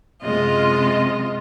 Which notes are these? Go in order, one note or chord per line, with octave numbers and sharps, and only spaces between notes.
F#2 C3 G#3 F4 D#5